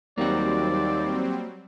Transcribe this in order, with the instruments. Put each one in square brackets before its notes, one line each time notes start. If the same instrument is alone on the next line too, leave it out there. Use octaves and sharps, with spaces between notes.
[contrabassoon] D#2 [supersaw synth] F#3 G3 C4 [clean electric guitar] A#3 F#4 [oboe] D5